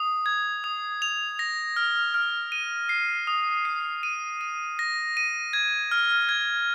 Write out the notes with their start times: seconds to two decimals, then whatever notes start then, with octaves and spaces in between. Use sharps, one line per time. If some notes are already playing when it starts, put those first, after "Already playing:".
Already playing: D#6
0.26 G#6
0.64 D#6
1.02 F7
1.39 A#6
1.76 F6
2.14 F6
2.52 D#7
2.89 C7
3.27 D#6
3.65 C7
4.03 D#7
4.41 D#7
4.79 A#6
5.17 D#7
5.53 G#6
5.91 F6
6.29 G#6